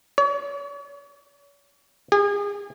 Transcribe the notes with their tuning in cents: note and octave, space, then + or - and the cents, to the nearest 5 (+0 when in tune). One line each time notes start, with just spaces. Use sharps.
C#5 +40
G#4 -35